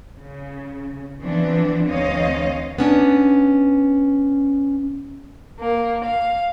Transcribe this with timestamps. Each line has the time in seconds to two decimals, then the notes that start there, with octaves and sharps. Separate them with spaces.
0.16 C#3
1.21 E3 F3 B3 C4 D4
1.85 D2 E3 C4 C#5 D#5 F5
2.78 B3 C#4 D4
5.58 A#3
6.04 F5